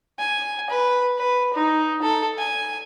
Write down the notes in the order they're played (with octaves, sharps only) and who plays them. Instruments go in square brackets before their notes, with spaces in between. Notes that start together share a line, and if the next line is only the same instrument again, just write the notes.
[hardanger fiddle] G#5
B4
B4
D#4
A4
G#5